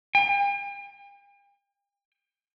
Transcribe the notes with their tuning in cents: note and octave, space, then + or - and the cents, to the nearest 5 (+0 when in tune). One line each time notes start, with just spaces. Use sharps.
G5 +45